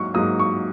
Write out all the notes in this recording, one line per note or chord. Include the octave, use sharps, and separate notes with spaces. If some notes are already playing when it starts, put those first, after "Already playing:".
Already playing: G#2 F#3 A#3 C#6
G#2 F#3 A#3 D#6
C#6